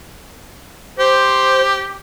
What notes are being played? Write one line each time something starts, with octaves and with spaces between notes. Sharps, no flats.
G4 C5